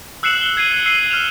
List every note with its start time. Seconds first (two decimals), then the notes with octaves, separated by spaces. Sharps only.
0.23 E6 F#6 C7 C#7 E7 F#7
0.41 G7
0.57 G#6 C7 D#7
0.86 E6 C7 D#7 G7
1.10 F6 E7 F7